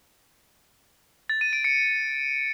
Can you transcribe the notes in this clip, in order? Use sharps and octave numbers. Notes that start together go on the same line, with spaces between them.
A6
D#7
D7
C#7